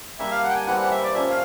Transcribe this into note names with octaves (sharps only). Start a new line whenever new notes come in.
G3 A#3 D4 E5
F5
F#5
G5
G#5
E3 G3 C4 F#5
F#5
E5
D5
F3 A#3 C#4 E5
F5